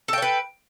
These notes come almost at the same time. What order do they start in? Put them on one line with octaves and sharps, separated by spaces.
A4 G5 C#5 B4